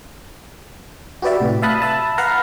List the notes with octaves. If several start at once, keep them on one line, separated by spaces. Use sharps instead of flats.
F#4 G4 B4 D5 E5
A2 C3
E5 F5 A5 B5 D#6 F#6
E5 A5 B5
B4 F5 F#5 A#5